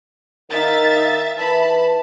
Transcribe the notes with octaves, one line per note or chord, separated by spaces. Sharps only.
D#3 D#4 E5 F5 A6
E3 A5 B5